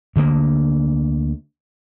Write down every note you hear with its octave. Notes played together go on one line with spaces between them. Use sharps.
D2 D3 G3 A#3